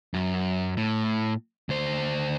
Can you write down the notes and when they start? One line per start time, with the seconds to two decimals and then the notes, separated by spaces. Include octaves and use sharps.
0.14 F#2
0.77 A2
1.69 D2 C5